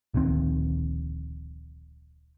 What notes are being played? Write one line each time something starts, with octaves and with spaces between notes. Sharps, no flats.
D1 A#1 D#3 C4